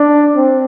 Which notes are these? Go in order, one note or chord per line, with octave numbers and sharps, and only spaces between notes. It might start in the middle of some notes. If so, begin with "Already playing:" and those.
Already playing: D4
C4